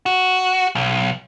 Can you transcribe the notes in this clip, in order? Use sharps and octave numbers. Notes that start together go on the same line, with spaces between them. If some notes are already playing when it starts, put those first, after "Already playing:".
F#4
B1